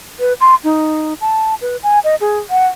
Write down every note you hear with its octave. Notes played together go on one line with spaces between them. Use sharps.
B4
C6
D#4
A5
B4
G#5
D#5
G#4
F#5